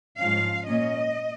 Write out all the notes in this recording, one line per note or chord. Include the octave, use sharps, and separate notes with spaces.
G#2 F3 C#4 F5
A#2 A#3 C#4 D#5